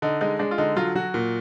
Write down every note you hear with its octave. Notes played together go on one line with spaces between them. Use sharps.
D3 D#4
G#3 D#4
G#3 D4
F4
D3 D#4
F#3 F4
F#3 F#4
A#2